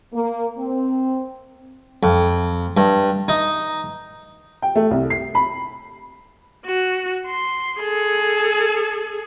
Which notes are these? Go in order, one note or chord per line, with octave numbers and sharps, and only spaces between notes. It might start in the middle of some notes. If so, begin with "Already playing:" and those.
A#3
C4
F2
G2
D#4
G5
A3
C2
C7
B5
F#4
C6
G#4 A4